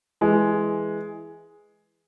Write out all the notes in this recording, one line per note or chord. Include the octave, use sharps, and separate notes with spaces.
E3 G#3